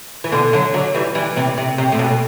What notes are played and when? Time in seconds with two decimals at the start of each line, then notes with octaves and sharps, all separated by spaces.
0.24 E3
0.32 B2 D3
0.53 D3 F#3
0.74 D3 F#3
0.94 E3 G3
1.15 E3 G3
1.36 C3 E3
1.57 C3
1.78 C3
1.92 A2
1.99 B2